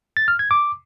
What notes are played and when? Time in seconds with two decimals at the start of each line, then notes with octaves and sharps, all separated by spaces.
0.17 A6
0.28 F6
0.39 G#6
0.51 D6